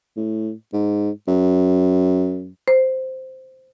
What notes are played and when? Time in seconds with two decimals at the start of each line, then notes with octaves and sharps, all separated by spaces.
0.16 A2
0.73 G#2
1.28 F#2
2.68 C5